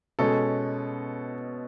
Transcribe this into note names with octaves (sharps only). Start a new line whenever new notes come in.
B2 G#3 C#4 A4